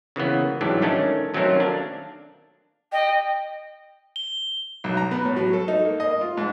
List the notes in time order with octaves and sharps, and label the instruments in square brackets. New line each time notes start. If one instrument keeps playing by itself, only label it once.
[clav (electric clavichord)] C#3 E3 A#3 B3
G#2 E3 F#3 G3 D4 G4
D#3 A3 C#4 D4
D#3 F#3 A3 C4 C#4 A#4
D4 F5
[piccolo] D#5 [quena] G5
[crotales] G7
[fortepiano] B1
A#5
B3
A2
F#3
A4
D#4
A#3
D#5
F4
G#2